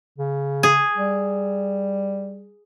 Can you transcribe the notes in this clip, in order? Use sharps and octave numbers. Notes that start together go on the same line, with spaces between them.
C#3
G#4
G3